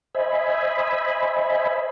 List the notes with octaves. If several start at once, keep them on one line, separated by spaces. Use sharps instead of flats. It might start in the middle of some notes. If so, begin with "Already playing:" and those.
C5 D#5 E5 G#5 B5